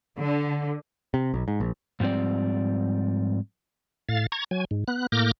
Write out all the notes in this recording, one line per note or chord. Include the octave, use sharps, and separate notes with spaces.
D3
C3
B1
G#2
A#1
G#2 F3 G3 C4 D5
A2 F5 A6
A#5 C#6 G#6
F#3 G#5
G#2
B3 F#6
A2 A#3 D6 F6 G6 A#6